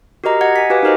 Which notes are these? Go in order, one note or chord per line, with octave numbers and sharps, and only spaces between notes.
F#4 G4 A#4 D#5 A#5
D#5 F#5 G#6
G#5 B6
F#4 G4 B4 F5 G#5 D6
D#4 F#4 A#4 C5 D#5